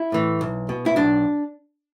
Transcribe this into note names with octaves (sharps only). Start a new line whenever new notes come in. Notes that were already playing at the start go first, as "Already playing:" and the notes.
Already playing: E4
A2 E3
B1
B2
E4
B1 D4